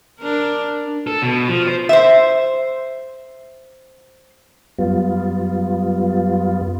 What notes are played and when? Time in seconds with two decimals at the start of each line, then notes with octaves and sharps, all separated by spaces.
0.20 D4 A#4
1.07 A4
1.22 B2
1.48 F3
1.67 C5
1.89 C5 E5
4.78 F#2 G3 B3 F4